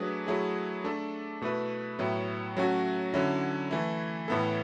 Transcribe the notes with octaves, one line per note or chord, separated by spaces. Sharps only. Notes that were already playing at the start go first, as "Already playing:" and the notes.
Already playing: F#3 A3 D4 G#4 B4
F#3 A3 E4 G#4
A3 D4 A4
B2 A3 E4 B4
A2 F#3 B3 E4
F#3 A3 C#4 F#4
D3 F#3 C#4 E4
E3 A3 E4
A2 E3 B3 E4 A4